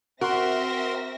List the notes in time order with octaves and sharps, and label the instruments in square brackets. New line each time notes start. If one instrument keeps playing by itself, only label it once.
[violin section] C4 E5 A#6 [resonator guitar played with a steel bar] F#4 [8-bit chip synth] A#4 C6